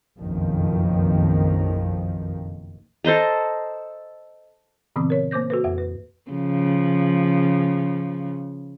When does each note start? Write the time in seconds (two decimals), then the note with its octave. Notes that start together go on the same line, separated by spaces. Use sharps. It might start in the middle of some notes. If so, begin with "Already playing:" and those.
0.18 F#1 B1 F2 D#3 F3
3.04 A4 C5 D#5 A#5
4.96 A#2 C#3 E3 B3 C4 D#6
5.10 A#4 C#5
5.31 A#3 C5 D6 G6 A#6
5.50 F#4 A4 B4
5.64 F2 E5
5.78 B4
6.31 C#3 F3